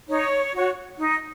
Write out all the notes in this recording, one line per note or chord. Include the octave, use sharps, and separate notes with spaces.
D#4 C#5
F#4 C#5
D#4